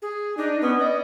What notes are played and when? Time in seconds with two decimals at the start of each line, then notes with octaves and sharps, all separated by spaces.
0.02 G#4
0.37 D4 D#4
0.61 B3 C#4
0.79 D5 D#5